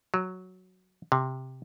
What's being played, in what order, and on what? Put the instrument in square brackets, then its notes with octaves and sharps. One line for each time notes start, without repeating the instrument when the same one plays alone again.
[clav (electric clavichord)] F#3
C3